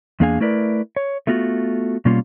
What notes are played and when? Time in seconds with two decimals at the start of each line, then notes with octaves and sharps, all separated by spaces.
0.20 E2 A#3 D4 G#4 F5 G#5
0.40 A3 E4 A#4 B4 D5
0.96 C#5
1.27 A3 B3 F4 F#4
2.05 B2 G3 A#3 C#4 F4